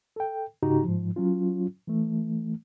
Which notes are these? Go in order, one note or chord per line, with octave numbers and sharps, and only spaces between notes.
A4 G5
G#2 C#3 D#4 F#4 G4 A#5
G#2 F3
F#3 C#4 F4
E3 A3